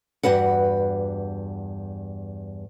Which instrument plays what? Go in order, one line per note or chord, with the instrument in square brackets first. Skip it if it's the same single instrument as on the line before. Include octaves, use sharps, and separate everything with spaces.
[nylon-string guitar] E2 G2 F#4 B4 F#5